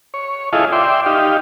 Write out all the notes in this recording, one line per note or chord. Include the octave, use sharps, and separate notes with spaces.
C#5
E4 F4 G#4 A4 D#5 F5
D5 E5 G5 C6
D#4 G4 F5